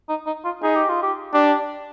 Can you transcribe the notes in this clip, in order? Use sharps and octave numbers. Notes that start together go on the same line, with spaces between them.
D#4
D#4
F4
D#4 G#4
G4
F4
G4
D4 G4